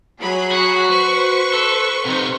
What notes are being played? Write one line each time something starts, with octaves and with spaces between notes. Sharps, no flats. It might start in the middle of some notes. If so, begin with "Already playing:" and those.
F#3 G#4 B5
F#4
B4 C5 C#6
A4
C3 D#4